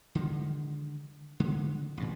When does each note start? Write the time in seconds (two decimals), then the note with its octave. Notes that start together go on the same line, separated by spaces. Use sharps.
0.15 D3 D#3 G#3
1.40 D3 G#3
1.97 A1 G2 A#2